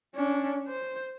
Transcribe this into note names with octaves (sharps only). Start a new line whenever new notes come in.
C#4 D4
C5